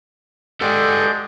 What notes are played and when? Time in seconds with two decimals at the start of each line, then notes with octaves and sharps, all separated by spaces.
0.61 G#3 G4 A4 D5 G5 G6